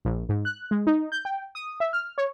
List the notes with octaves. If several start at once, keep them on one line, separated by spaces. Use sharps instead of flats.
A#1
G#2
F#6
G#3
D#4
G6
G5
D#6
E5
F6
C#5